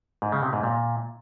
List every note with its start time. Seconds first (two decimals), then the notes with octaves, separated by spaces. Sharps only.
0.22 G#2
0.32 C#3
0.43 C3
0.53 G#2
0.63 A#2